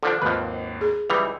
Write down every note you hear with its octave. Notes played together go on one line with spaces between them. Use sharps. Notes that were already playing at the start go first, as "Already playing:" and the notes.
D3 F3 D4 A4
G#1 D#2 F3 B4
G#4
C#2 E3 G3 D#6 F7